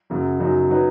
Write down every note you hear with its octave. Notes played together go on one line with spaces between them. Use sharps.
F#2 C#3 F#3
F#2 C#3 F#3 D#4 F#4
F#3 D#4 B4